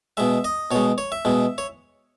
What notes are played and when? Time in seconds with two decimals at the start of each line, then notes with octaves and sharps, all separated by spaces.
0.17 B2 G#3 E5
0.44 D#5
0.71 B2 G#3 C#5
0.98 C#5
1.12 E5
1.25 B2 G#3
1.58 C#5